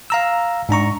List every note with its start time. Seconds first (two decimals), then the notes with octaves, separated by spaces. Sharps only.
0.10 F5 A#5 E6
0.69 G#2 D4 A#5 C#6